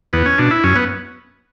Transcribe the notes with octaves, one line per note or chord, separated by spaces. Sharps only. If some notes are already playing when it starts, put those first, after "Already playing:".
E2 B3
C#4
B2 D4
E4
F#2 C#4
B3